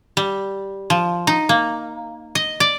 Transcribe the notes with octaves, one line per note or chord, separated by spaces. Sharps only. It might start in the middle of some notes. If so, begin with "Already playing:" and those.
G3
F3
D#4
A#3
D#5
D5